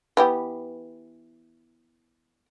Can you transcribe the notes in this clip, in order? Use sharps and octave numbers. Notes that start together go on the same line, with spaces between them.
E3 B3 G4